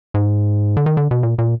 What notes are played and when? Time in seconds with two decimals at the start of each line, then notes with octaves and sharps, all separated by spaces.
0.14 G#2
0.77 D3
0.86 D#3
0.97 D3
1.11 B2
1.23 A#2
1.38 A#2